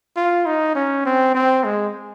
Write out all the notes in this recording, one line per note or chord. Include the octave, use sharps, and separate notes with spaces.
F4
D#4
C#4
C4
C4
G#3